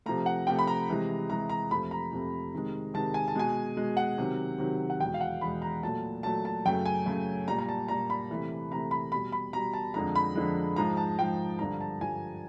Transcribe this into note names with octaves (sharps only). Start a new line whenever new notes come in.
C3 F3 A3 A#5
F#5
C3 F3 A3 G5
B5
A#5
C3 E3 G#3
C3 E3 G#3 A#5
A#5
F2 C3 F3 A3 B5
A#5
F2 C3 F3 A3
C3 D#3 G#3
C3 D#3 G#3 A5
G#5
A5
B2 G#3 G#5
B2 G#3
F#5
C3 D#3 F#3
C3 D#3 F#3
F#5
E2 B2 G#3 G5
F5
F#5
E2 B2 G#3 B5
A#5
A#2 F#3 A3 A5
A#2 F#3 A3 A5
A5
F#2 C#3 F#3 A3 G5
G#5
F#2 C#3 F#3 A3
A#2 G3 A#5
A#5
A5
A#2 G3 A#5
B5
C3 E3 A3
C3 E3 A3 A#5
B5
B2 G3 B5
B5
B2 G3 A#5
A5
F2 D3 F3 G#3 A#5
B5
F2 D3 F3 G#3
G#2 F3 G#3 A#5
A5
G#2 F3 G#3 G5
G2 D3 F3 A#5
A5
G2 D3 F3 G#5